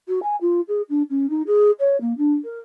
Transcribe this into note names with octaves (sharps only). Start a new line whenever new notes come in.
F#4
G#5
F4
G#4
D4
C#4
D#4
G#4
C#5
A#3
D4
A#4